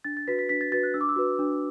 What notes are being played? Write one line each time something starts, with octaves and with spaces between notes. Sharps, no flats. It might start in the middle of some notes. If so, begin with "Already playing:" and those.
D4 A6
A6
F#4 B4 B6
B6
D4 B6
A6
F#4 B4 A6
F#6
D4 E6
D6
E6
F#4 B4
D4